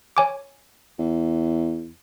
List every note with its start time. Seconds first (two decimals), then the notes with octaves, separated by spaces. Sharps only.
0.17 C#5 G#5 D6
0.99 E2